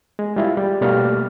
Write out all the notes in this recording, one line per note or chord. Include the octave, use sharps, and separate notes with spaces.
G#3
G3 E4 F4
G3
B2 G3 A3 A#3 F6